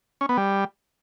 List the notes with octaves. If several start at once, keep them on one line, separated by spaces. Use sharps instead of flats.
C#4
B3
G3